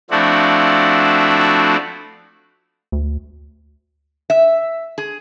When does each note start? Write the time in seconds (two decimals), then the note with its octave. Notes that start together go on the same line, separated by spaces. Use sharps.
0.10 F3 A3 C4 D4 E4 F#4
2.92 D2
4.30 E5
4.98 G#4